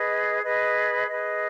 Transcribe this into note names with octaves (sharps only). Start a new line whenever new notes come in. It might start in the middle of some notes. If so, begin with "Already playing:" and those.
Already playing: G#4 B4 D#5
G#4 B4 D#5
G#4 B4 D#5